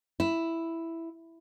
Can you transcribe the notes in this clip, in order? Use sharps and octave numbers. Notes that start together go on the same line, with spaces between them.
E4